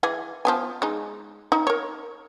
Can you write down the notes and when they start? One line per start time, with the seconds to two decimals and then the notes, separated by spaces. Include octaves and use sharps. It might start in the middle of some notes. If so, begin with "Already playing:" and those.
0.03 E3 G#4 G#5
0.45 F3 B3 G#5
0.82 G#3 D#4
1.52 D#4
1.67 A#4 C#5